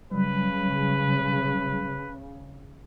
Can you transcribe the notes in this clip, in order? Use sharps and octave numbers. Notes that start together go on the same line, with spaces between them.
C#3 F#3 G3 B4